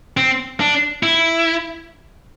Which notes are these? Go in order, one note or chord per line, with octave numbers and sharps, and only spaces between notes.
C4
D4
E4